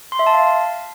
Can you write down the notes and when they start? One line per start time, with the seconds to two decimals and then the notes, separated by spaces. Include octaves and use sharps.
0.12 C6
0.19 E5
0.27 A5
0.34 F5